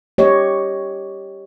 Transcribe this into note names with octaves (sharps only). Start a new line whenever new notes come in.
G4 C#5 D#5